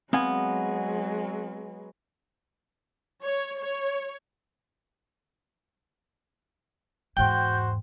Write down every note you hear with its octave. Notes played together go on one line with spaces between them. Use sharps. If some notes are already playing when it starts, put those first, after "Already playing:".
F#3 G#3 B3 C4 F5 G#5
C#5
C#5
E2 G#2 F#4 C5 G5 G6